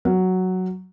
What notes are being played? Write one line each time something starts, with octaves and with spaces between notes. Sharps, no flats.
F#3